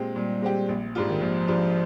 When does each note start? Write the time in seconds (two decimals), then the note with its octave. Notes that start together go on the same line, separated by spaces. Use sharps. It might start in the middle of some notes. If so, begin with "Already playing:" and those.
Already playing: A#2 G#3 C4 G4
0.15 A#2 G3
0.42 G#3 C4 G4
0.69 A#1
0.95 G#2 G3 D4 F4
1.09 D#3
1.21 A#1 F3
1.48 G#2 G3 D4 F4